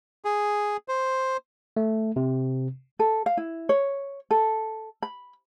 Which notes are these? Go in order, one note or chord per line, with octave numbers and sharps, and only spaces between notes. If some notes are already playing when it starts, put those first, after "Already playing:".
G#4
C5
A3
C3
A4
F5
E4
C#5
A4
B5